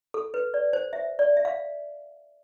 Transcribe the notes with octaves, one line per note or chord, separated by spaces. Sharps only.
A4
B4
D5
C5
E5
D5
E5
F5